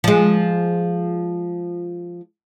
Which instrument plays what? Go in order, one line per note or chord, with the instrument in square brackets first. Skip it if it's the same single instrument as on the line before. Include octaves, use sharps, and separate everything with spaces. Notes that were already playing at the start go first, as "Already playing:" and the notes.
[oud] F3 G#3